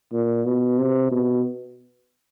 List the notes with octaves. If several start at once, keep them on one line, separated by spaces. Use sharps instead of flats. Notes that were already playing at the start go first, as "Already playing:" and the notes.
A#2
B2
C3
B2